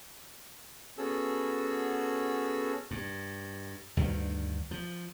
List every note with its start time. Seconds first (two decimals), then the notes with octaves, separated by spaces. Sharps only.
0.98 B3 C#4 F#4 G#4 A4 E6
2.91 G2
3.97 D2 G2 D3 D#3
4.71 F3